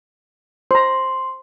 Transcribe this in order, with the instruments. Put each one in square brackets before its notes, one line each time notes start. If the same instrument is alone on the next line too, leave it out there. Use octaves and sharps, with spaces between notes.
[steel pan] C5 A#5 [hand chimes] C6